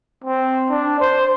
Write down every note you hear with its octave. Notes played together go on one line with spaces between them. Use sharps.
C4
D4
C5